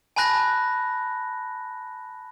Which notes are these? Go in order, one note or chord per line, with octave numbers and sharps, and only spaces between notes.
G#5 A5 B5 F#6 A#6